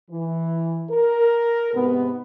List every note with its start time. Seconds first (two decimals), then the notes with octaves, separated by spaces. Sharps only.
0.11 E3
0.91 A#4
1.74 G#2 C3 B3